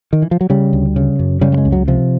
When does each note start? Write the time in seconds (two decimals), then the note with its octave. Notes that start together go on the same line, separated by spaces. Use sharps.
0.13 D#3
0.22 E3
0.31 F3
0.41 F#3
0.50 C#3 G3
0.73 D2
0.96 C#3
1.19 F#2
1.41 C#3 G3
1.52 G3
1.58 G#3
1.65 C#2
1.72 F#3
1.88 C3 F3